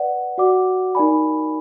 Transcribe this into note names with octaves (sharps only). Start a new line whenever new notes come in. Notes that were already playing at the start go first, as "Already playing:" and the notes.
Already playing: B4 D5 F#5
F#4 D5 F#5 D6
D#4 A#4 D5 G#5 B5